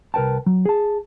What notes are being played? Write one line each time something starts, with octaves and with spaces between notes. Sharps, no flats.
C2 A#4 B4 G5 A5
F#3
G#4 A5